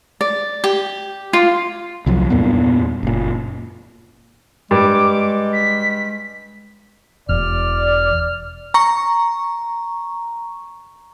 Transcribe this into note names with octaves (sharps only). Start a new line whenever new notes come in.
D5
G4
F4
C2 F3 F#3
E2 G2 A#2 B3
F#1 A#2
G2 G#3 D6
B6
E1 D5 F6
A#5 C#6